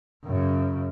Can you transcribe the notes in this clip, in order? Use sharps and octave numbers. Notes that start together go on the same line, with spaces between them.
F#2 C#3